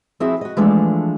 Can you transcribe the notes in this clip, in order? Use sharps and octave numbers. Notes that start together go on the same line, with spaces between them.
F3 C4 E4 F#4 G#4 E5
F#4 D#5
E3 F3 G#3 A3 D4 A4